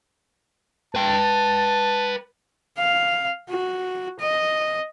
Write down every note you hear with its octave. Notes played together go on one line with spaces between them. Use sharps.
B4 G5 A5
F5
F#4
D#5